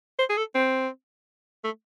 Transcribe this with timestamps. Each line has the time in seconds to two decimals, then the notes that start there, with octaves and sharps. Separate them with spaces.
0.19 C5
0.29 G#4
0.37 A4
0.55 C4
1.64 A3